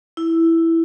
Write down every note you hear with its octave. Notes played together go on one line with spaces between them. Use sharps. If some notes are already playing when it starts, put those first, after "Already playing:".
E4